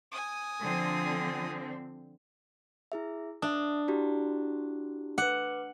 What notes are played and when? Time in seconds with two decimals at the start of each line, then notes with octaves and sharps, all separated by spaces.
0.12 G#5 D#6
0.62 D3 F3 C4
2.92 E4 G#4 E5
3.42 D4 E5 D#6
3.88 E4 F#4 G4
5.18 B4 F#5 D6